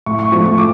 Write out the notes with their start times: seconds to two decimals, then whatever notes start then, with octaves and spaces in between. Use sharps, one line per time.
0.06 A2 C#6
0.19 C#6
0.32 F3 C#6
0.35 A3
0.45 C#6
0.58 D6